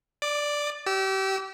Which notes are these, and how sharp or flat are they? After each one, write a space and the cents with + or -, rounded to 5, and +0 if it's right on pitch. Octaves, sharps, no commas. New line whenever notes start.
D5 +0 D6 +40
G4 -30 E6 -5